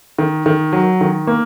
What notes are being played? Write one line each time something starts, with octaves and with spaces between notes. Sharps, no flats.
D#3
D#3
F#3
D#3
A#3